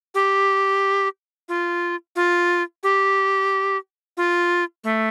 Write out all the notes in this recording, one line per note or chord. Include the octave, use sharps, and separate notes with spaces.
G4
F4
F4
G4
F4
A3